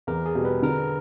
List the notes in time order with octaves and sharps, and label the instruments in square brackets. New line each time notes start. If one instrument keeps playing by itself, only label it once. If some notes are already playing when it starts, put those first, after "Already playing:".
[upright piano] E2 [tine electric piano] A#4
[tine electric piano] G#4
[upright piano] B2 G3
[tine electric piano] B4
[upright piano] D3 [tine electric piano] A#4